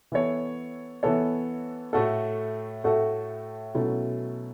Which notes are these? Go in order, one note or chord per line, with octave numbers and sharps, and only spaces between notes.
E3 B3 A4 C#5
E3 B3 A4 C#5
A2 A3 F#4 A4
A2 A3 F#4 A4
B2 F#3 A3 C#4 E4